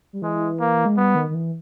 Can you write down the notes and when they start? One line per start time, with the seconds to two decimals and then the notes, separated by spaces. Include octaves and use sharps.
0.13 G3
0.22 E3 G#3
0.60 A#3
0.85 G#3
0.97 G3 B3
1.15 D#3
1.29 D#3
1.34 E3